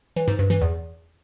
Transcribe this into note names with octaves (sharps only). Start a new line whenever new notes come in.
E3
G#2
G2
E3
E2